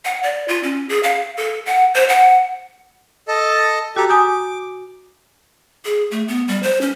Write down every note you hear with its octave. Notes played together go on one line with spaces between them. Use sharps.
F#5
D5
F4
C#4
G#4
F5
A4
F#5
C5
F#5
A4 D#5 A5
A6
F#4 G4 A4 A#5
G#5 D6 D#6 G6
G#4
A3
B3
G3
C5
C#4